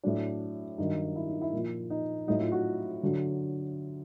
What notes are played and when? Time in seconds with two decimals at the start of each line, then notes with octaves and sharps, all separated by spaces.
0.03 A2 F#3 D4
0.78 G2 D#3 F#3 D#4
1.16 E4
1.28 D#4
1.42 E4
1.53 A#2 F3
1.90 D#4
2.27 A2 F#3 D#4
2.40 F4
2.52 F#4
3.03 D3 F#3